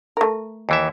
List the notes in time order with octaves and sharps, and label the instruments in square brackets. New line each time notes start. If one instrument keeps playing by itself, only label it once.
[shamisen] A3 A#4
[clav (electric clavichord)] D#2 E3 E5